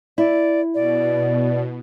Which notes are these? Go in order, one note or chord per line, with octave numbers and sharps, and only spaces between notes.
E4 D5
B2 D5